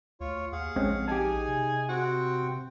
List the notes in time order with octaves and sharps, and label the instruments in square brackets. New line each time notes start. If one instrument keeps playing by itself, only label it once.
[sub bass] D2 [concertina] F4 C#5
[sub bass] D#2 [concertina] G#4 F5 F#5
[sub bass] A#1 [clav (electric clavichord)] G#3 C4 C#4
[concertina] D#4 G#5 [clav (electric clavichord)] G4 A5 [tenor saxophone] G#4
[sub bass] C3
[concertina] C4 G5 [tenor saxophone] F#4